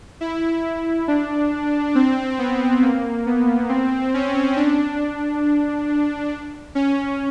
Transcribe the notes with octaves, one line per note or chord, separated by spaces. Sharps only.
E4
D4
C4
B3
A#3
B3
C4
C#4
D4
D4
D4
C#4